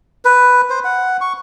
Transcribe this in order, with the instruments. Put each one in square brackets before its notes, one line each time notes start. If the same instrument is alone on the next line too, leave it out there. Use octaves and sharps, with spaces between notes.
[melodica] B4
C5
F#5
C#6